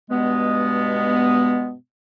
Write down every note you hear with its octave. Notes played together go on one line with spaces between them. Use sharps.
G2 B2 G#3 B3